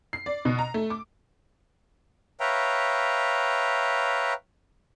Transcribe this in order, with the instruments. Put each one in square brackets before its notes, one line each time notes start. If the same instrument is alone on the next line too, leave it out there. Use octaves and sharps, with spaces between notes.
[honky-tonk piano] C7
D5
B2
A#5
A3
D6
[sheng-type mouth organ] B4 C#5 E5 F5 G5 A#5